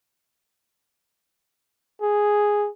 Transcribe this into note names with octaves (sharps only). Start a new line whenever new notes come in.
G#4